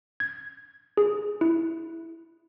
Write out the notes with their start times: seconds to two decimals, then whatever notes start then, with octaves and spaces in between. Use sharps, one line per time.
0.20 G#6
0.97 G#4
1.41 E4